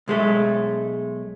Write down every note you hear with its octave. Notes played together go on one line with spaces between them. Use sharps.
B1 G#3 A3